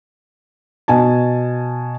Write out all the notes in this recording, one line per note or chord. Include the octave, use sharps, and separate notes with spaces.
B2 G#5 A5